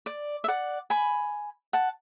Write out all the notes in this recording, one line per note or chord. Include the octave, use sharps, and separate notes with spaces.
D5
E5
D5 F#5
G#5 B5
F#5 A5